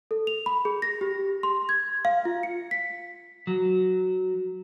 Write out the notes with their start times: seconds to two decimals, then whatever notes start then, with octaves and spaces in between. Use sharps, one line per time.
0.11 A4
0.27 F7
0.46 B5
0.65 G#4
0.82 A#6
1.01 G4
1.43 C6
1.69 G#6
2.05 F5
2.25 F4
2.43 C#7
2.71 B6
3.47 F#3